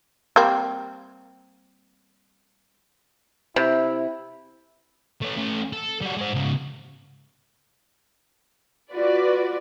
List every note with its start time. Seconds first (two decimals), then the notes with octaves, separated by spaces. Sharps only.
0.36 G3 A#3 C4
3.56 C3 E4
5.22 A3 C#4
5.37 A3 C#4
5.73 A4
6.01 G3 F#4
6.17 G#3 C5
6.33 G#2 C#3
8.93 F4 F#4 B4 D5